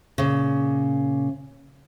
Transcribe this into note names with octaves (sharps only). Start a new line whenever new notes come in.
A#2 C#3